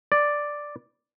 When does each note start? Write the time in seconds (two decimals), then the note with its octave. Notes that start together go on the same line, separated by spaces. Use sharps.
0.12 D5